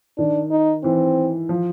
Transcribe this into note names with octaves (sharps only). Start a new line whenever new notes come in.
D#3 D4
D#4
E3 C4
F3